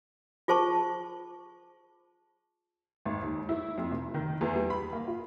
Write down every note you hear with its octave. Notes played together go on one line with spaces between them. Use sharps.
F4 G#4 C5 A5 C#6
G#1
D#2
E4
F2
F1
D#3
E2
G3
B5
A#3
F4